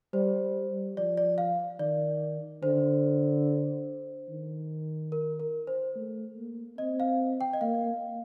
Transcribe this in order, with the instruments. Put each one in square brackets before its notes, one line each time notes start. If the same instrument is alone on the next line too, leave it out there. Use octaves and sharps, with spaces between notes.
[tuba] G3 [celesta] C5
[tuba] F3 [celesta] D5
[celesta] D5
F5
[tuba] D#3 [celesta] D5
[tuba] D3 [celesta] C5
[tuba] D#3
[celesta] A#4
A#4
C5
[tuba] A3
A#3
[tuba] C4 [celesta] D#5
[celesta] F5
G5
D#5
[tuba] A#3 [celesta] F5